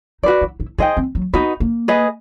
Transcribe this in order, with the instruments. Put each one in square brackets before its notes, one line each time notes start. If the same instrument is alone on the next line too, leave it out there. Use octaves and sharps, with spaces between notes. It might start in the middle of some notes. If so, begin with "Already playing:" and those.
[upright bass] D#4 [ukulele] F#4 B4 D5
[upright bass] E4
E4
[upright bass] D#4 [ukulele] G#4 C5 D#5 G5
[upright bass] C4
F#3
[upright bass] B3 [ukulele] D#4 F#4 B4 D#5
[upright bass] A#3
[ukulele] G#4 B4 D#5